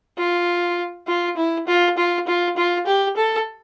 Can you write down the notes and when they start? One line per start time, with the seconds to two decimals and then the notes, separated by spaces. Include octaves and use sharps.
0.18 F4
1.07 F4
1.37 E4
1.67 F4
1.97 F4
2.27 F4
2.57 F4
2.86 G4
3.16 A4